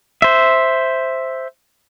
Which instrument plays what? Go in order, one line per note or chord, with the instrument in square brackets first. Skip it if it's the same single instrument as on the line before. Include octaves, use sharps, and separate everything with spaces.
[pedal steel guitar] C5 E5